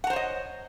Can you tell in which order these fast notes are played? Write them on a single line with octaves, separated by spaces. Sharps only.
F#5 A#5 C5 C#5 D#5